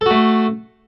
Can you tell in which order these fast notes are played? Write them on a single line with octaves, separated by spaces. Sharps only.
A4 F#4 A3